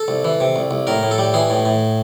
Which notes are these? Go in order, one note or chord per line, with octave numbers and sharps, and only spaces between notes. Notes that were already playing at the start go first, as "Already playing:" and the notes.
Already playing: A4
C2
E3
C3
C2
C2
A2 A#4
A2
A4
G3
E3 G#4
A2
A2